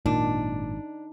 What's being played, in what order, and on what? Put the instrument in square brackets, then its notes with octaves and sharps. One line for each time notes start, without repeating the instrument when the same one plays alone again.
[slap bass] G#1 F#2 [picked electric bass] A#2 [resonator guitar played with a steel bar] D4 [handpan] D#4